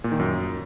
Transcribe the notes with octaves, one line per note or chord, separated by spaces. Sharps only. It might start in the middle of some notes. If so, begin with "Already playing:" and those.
A#2
D#3
F#2